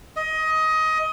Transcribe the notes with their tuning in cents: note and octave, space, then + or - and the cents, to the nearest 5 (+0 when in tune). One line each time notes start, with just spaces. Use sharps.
D#5 +20